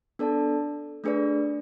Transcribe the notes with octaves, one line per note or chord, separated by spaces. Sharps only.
B3 D4 A4 D5 A5
A3 D4 G#4 B4 D5